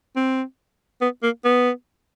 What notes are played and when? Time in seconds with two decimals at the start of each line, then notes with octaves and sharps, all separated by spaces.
0.16 C4
1.01 B3
1.23 A#3
1.44 B3